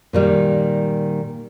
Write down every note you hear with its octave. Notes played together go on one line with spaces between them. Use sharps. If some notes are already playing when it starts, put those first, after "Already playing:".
A#2 D#3 G3